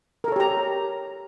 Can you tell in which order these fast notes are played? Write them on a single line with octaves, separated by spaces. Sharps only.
A#4 A4 C#5 G4 A#5